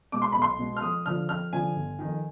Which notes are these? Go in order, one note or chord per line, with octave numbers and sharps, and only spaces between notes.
B2 G#3 D6
C6
B1 B5
C6
B2 G#3
F6
F2 D#6
D3 F3 F6
F2 F6
D3 F3 G#5
G1
F2 D#3